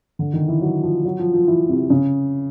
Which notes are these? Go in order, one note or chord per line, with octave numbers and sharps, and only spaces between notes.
D3
D#3
E3
F#3
F3
F#3
F3
F3
E3
C3
C#3